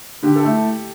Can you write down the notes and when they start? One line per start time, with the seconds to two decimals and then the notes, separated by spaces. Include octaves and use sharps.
0.23 D3 G4
0.36 A4
0.43 A3 E4